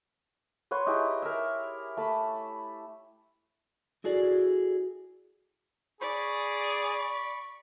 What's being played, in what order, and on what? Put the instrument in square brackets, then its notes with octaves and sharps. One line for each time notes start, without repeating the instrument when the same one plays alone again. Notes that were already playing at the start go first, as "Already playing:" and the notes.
[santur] B4 C#5 F#5 C6
D#4 E4 G4 G#4
A#4 E5
A3 A5 B5
[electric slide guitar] E4 F#4 G#4 A4 D5
[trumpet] G#4 [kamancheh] D5 [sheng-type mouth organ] B5 C#6